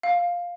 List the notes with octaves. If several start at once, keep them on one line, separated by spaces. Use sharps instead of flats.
F5